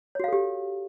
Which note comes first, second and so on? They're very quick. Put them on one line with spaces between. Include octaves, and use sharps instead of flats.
C#5 F#4 F5 A4 G4